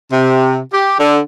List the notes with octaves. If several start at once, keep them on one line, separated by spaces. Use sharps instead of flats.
C3
G4
D3